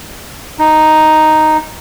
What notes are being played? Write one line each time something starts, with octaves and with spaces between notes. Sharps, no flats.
D#4